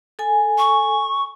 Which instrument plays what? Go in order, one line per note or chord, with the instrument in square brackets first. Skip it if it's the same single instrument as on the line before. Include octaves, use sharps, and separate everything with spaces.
[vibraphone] A4 G#5
[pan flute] C#6